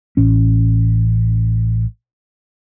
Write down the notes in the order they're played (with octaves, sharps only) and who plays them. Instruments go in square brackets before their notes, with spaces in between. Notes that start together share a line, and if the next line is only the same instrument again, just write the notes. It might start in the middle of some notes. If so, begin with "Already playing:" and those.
[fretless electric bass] A1 C#4